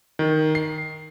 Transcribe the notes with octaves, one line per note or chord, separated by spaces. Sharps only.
D#3
C7